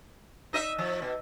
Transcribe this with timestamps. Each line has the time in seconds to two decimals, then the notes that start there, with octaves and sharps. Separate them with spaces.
0.53 D#4 D#5 E5
0.78 F3
1.02 B2